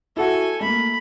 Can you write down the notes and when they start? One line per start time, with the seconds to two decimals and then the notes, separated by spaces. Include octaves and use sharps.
0.17 E4 F#4 A4 G#5
0.61 A3 A#3 B5